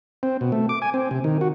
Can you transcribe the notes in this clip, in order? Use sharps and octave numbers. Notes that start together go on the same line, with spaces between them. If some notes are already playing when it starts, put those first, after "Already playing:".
C4
B2
A3
D6
G#5
C4
C3
D#3
F#4